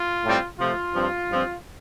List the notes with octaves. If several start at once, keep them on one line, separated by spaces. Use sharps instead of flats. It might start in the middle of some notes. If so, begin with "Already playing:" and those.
Already playing: F4
A2 G3 C4
C3 F3 A3 F4
G2 F3 C4
G2 F3 C4